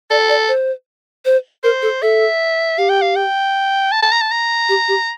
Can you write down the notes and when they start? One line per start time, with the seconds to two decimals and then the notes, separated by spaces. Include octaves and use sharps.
0.10 A4 D5
0.29 D5
0.48 C5
1.25 C5
1.63 A#4 C5
1.82 A4
2.02 A4 E5
2.78 G4 F5
2.89 G5
3.02 F5
3.16 G5
3.92 A5
4.02 A5
4.12 A#5
4.21 A5
4.31 A#5
4.69 G4
4.88 G4